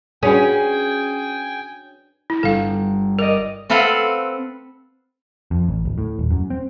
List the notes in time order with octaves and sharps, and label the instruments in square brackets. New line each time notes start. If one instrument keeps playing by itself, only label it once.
[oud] C#4 [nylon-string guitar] D4 F#4 B4 [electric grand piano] G#4 [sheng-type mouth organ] G5 G#5
[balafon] E4
[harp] G1 [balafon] A4 F5
[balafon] A#4 [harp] D5 D#5
[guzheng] C4 A4 B4 F5 F#5 C6
[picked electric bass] F2
A1
D1
A2
D#1
F#2
C4